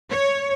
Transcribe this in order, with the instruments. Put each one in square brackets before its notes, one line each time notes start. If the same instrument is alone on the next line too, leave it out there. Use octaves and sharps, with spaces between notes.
[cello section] C#5